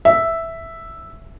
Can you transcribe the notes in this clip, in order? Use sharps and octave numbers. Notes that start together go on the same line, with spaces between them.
E5